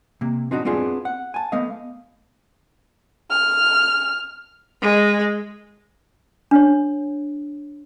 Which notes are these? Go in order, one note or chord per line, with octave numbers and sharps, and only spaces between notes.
C3 A#3
C4 D4 D#4 F#4
B3 C4 D4 F4 G#4
F#5
G#5 A5
A3 B3 D#5 F5
F6
G#3
D4 C#5